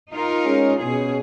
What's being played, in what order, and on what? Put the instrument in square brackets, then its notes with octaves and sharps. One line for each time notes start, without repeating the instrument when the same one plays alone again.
[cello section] D#4 F4 A#4
[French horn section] G#3 C#4
[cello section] B2 G#4 [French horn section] C#4